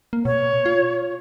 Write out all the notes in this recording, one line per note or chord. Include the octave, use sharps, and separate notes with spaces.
A#3
B2 C#5
F4